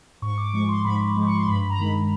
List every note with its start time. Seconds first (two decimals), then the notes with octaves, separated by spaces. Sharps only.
0.22 G#2 C#6
0.38 D6
0.48 D6
0.53 F3 G#3 C#6
0.69 C6
0.85 G#2 B5
1.16 F3 G#3
1.24 C#6
1.36 C6
1.47 G2 B5
1.70 A#5
1.78 D#3 G#3 B5